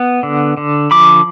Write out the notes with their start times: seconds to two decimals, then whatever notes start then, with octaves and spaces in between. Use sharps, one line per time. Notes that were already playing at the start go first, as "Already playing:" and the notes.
Already playing: B3
0.23 D3
0.57 D3
0.91 F3 B5 D6